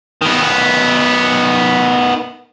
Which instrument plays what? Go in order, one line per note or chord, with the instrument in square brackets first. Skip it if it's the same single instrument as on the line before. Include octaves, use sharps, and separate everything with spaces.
[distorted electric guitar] D#3 B3